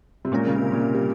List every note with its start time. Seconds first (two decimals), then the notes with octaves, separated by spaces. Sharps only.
0.25 C3
0.32 A#2 G#3 C#4 G4 A#4
0.47 C#3
0.57 C3
0.72 A#2
0.81 C3
0.95 G3